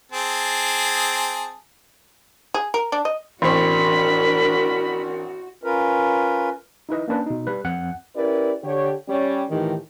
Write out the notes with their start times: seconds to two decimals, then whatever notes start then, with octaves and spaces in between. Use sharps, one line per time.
0.12 C4 G#4 A5
2.54 G#4
2.74 A#4
2.92 D4
3.05 D#5
3.42 A1 C4 D4 F#4 A#4 B5 C#6
5.64 C#4 F4 A#4 B4
6.89 D#4 E4 B4 D#5
7.08 A#3 C#4 D4 B4
7.26 B2 D#4
7.47 G3 B4
7.64 F2 F#5
8.15 C#4 E4 G4 A#4 B4 D5
8.63 D3 G4 C#5
9.08 G3 C#4 C#5
9.50 A2 D#3 E3 D#4 F4 G4